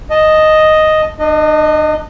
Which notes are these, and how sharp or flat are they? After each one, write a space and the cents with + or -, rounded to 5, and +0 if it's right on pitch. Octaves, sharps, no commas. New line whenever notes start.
D#5 +0 A5 +0
D4 +35 D#5 -10